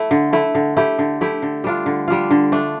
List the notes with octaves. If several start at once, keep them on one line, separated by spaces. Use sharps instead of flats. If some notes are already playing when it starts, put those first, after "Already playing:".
Already playing: A3 E4
D3
A3 E4
D3
A3 E4 G4
D3
A3 E4 G4
D3
G3 D4 F4
D3
G3 D4 F4
D3
A3 D4